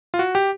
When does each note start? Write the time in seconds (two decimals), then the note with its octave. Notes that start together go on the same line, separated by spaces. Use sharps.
0.14 F4
0.19 F#4
0.35 G4